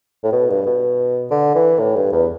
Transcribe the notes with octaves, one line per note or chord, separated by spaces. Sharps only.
A2
B2
G2
B2
D3
E3
A2
G2
E2